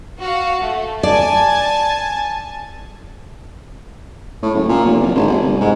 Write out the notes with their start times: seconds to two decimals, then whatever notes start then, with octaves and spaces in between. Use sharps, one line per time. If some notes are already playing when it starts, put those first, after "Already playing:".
0.19 F#4 F5
0.63 A3
1.03 D5 G#5 A5
4.42 A2
4.54 F#1
4.69 A#2
4.86 F1
5.00 D1
5.15 G#1
5.27 G1
5.42 C2
5.61 G#2